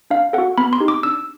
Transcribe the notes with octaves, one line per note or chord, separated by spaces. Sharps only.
D4 F5
F#4 A4 F#5
B3 B5
C6
D#4 G4
D6
D4 E6